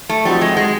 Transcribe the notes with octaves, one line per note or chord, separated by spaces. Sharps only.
A3
F3 G3 A3 C4 D#4 F#4
G#3
G#3